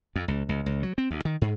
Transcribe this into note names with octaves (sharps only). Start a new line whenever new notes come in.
F2
C#2
C#2
C#2
F#3
C4
D2
D#3
G#2